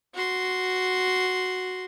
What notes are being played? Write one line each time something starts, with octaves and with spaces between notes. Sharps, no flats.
F#4 C6